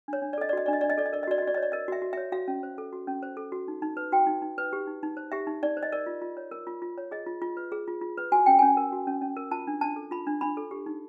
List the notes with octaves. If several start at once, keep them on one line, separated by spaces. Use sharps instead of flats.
D4 C#5
D4
D5
A4 D#5
D5
F#4 D#5
D4 D5
D#5
D4 D5
D#5
A4 D5
D#5
A#4 D5
D#5
F#4 D5
D#5
F#4
D5
C#5 D#5
D5
A#4 D#5
F#4 E5
F#4
E5
C#5
F#4 F5
C#4
C5
A4
F#4
C#4
C5
A4
F#4
D#4
D#4
B4
F#4 G5
D#4
D#4
B4
G4
D#4
D#4
C5
G4 E5
D#4
D#4 D5
C5
D#5
A#4 D5
F4
F4
C#5
A#4
F4
F4
C#5
G#4 D#5
F4
F4
B4
G#4
F4
F4
B4
F#4 G#5
C#4 G5
C#4 G#5
A#4
F#4
C#4
C#4
A#4
F4 A5
D4
D4 A5
A4
F4 B5
D4
D4 B5
A4
G4
D#4